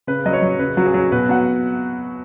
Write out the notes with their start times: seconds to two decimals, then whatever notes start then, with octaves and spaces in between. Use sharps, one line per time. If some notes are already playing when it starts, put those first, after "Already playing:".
0.07 C#3 B4
0.25 F#3 D#5
0.33 C#5
0.42 F#3
0.59 C#3 B4
0.77 F#3 F#4
0.86 G#4
0.94 F#3
1.12 B2 B4
1.29 F#3 F#5